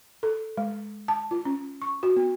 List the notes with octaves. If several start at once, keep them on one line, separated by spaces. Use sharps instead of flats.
A4
G#3
A5
F4
C#4
C#6
F#4
B3